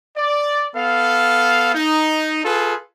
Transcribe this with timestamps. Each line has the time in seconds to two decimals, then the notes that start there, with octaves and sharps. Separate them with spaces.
0.17 D5
0.75 B3 A4 F5
1.75 D#4
2.45 F4 G#4 A4 B4